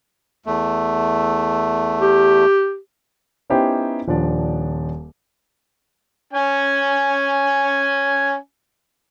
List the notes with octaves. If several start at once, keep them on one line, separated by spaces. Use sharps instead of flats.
E2 A3
G4
B3 C#4 D#4 E4 G4 C5
D#1 F3 D4 D5
C#4 G#5